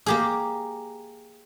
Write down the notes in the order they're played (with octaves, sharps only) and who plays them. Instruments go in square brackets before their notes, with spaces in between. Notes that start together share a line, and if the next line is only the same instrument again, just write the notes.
[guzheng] A#3 G4 G#4